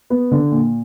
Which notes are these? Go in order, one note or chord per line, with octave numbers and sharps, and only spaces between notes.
B3
D3
A#2